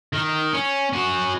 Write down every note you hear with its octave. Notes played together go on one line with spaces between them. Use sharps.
D#3
C#4
C#4 F#4